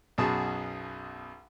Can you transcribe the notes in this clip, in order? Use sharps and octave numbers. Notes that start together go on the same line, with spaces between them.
B1 F#2 B2 F#4 G#4 A5